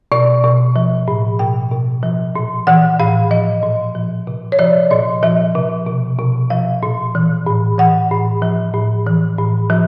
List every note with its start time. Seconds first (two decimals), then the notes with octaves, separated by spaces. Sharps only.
0.12 B2 D5
0.44 B2
0.76 F3
1.08 A2
1.39 B2 G5
1.71 B2
2.03 F3
2.36 A#2
2.67 E3 F#5
3.00 A2 F5
3.31 F3 D#5
3.63 A#2
3.95 F3
4.27 C3
4.52 C#5
4.59 F3 D5
4.91 A#2 D#5
5.23 F3 E5
5.55 C3
5.86 B2
6.19 B2
6.50 F3 F5
6.83 A#2
7.15 E3
7.46 A2
7.78 E3 F#5
8.11 A2
8.42 F3
8.74 A2
9.07 E3
9.38 A2
9.70 F3